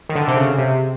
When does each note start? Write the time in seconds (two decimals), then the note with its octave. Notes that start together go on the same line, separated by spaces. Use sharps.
0.09 D#3
0.15 D3
0.28 C3
0.37 C#3
0.58 C3